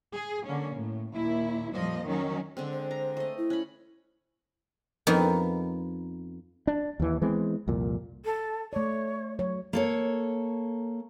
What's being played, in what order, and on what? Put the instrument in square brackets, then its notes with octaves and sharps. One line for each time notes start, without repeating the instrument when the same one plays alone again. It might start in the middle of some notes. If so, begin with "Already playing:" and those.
[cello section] G#4
D3 A#3 C#4
A2
D#2 A#2 E4
F2 A#2 F3 G3 D#5
D#3 F#3 C#4 D#4
[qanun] D3 G#3 C4
[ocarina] C5
[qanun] A#5
A3 D#5
[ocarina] E4
[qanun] C#4 B5
[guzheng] F2 B3 D#4 A#4
[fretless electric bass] D4
D#2 E3
E3 G#3 B3 C4
C2 F2 A#2
[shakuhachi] A4
[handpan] A3 D5 [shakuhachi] C#5
[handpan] F#3 C#5
[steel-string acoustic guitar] A#3 A4 C#5